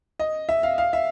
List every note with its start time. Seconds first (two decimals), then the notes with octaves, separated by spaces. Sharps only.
0.20 D#5
0.49 E5
0.63 F5
0.78 F5
0.93 E5